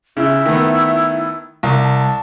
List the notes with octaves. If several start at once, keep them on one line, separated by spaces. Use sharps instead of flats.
C#3 E4
D#3 A3 B3
C2
A5